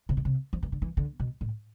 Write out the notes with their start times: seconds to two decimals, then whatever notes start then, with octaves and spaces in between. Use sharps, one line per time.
0.09 C3
0.17 B2
0.25 C3
0.53 F3
0.63 E3
0.72 D3
0.82 E3
0.97 D3
1.20 B2
1.41 A2